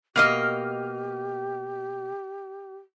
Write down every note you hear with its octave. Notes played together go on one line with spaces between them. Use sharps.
B2 A#3 G4 D#5 F6